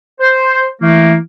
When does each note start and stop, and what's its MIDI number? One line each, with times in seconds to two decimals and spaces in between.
0.21 0.66 72
0.82 1.18 52
0.82 1.13 57
0.82 1.13 58